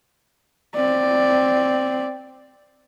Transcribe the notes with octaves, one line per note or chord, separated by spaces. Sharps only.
C4 D5